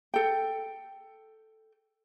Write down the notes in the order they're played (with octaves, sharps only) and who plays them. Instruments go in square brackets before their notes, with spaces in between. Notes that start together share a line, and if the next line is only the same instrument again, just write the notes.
[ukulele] A4 G5